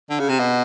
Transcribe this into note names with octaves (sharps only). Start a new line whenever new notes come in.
D3
C#3
C3
B2